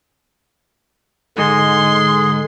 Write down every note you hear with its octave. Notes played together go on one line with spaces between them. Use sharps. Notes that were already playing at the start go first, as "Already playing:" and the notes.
G#2 D3 G#3 D#4 G#4 C6